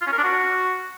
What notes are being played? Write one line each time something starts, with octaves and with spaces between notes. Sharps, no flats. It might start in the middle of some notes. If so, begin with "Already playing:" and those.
F4
C#4
A#4
D4
F#4